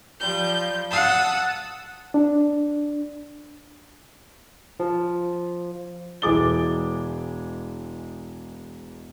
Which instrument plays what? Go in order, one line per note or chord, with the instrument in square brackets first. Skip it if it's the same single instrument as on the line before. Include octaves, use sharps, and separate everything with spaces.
[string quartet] F3 G3 G6
F#5 A5 D#6 E6
[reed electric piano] D4
[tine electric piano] F3
[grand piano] E1 E3 G#3 D6 A6 G7